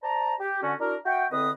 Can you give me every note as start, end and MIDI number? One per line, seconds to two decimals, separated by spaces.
0.03 0.34 72
0.03 0.34 74
0.03 0.34 81
0.03 0.34 82
0.40 0.60 67
0.62 0.74 50
0.62 0.74 61
0.62 0.74 66
0.80 0.96 62
0.80 0.96 64
0.80 0.96 66
0.80 0.96 70
1.06 1.26 66
1.06 1.26 76
1.06 1.26 78
1.06 1.26 79
1.31 1.50 40
1.31 1.50 50
1.31 1.50 60
1.31 1.50 71
1.31 1.50 75
1.31 1.50 87